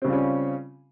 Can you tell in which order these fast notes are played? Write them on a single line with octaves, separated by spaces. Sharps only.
C4 C#3 G3 F4 C#4